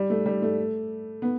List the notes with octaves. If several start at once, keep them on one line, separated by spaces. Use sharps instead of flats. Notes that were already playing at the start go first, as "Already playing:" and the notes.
Already playing: G3
A3
G3
A3
B3